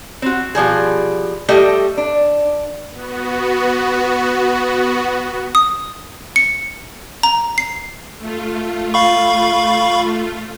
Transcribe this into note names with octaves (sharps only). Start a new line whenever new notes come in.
C4 F#4
B2 F3 G3 G#4
G3 A3 G4 A4 D#5
D4
B3 F#4
D#6
C#7
A#5
C7
A3 F4
F5 B5 C#6